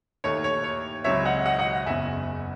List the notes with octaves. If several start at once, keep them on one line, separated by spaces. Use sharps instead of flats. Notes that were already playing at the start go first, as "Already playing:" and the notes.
D#2 D#3 A3 C#5
C#5
C#5
C#2 C#3 F#3 C4 C#5 E5
D#5 F#5
D#5 F#5
D#5 F#5
F#1 E2 C#3 E5 G#5